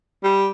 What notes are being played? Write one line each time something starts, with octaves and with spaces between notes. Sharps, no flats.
G3